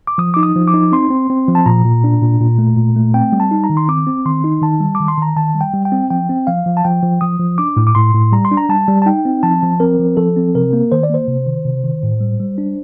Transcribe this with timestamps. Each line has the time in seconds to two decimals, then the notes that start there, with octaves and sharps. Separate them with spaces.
0.07 D6
0.18 F3 D#6
0.34 D#4 D6
0.43 D#6
0.56 F3
0.68 D6
0.74 D#4
0.92 C4 C6
1.10 C4
1.30 C4
1.48 F3
1.55 A5
1.66 A#2 A#5
1.85 A#2
2.04 D4
2.21 A#2
2.40 A#2
2.58 A3
2.77 A#2
2.96 A3
3.14 C4 G5
3.32 G3
3.40 A5
3.51 D#4
3.64 A#5
3.70 D#3
3.77 C6
3.88 C4 D6
4.07 C4
4.25 D#3 C6
4.44 D#4
4.62 D#3 A5
4.80 G3
4.95 D#3 D6
5.08 C6
5.18 D#3 A#5
5.36 D#3 A5
5.55 G3
5.61 G5
5.74 G3
5.85 G5
5.92 C4
6.10 F3 G5
6.29 C4
6.47 F3 F5
6.66 F3
6.77 A5
6.85 F3 G5
7.03 F3
7.21 F3 D#6
7.40 F3
7.58 D4 D6
7.77 A2
7.87 D6
7.95 A2 C6
8.14 A2
8.32 G3 A#5
8.45 C6
8.51 D4
8.57 A#5
8.69 G3 A5
8.88 G3
9.02 A5
9.06 D#4 G5
9.25 C4
9.43 F3 A5
9.63 F3
9.80 C4 A#4
9.99 F3
10.17 F3 A4
10.37 C4
10.55 C3 A#4
10.73 A#3
10.92 D#3 C5
11.03 D5
11.10 A#3 C5
11.28 C3
11.47 D#3
11.65 C3
11.84 D#3
12.03 A2
12.20 G3
12.40 G3
12.58 D4